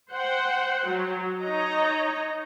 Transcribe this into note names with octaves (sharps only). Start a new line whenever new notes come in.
C5 F#5 G5
F#3
D#4 C#5 D#5 A#5